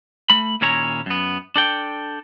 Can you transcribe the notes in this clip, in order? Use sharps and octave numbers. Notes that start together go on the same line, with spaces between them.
A3 B5
D#2 A#2 C#4 E4 C#5 A#5
F#2 B3
D4 A4 G5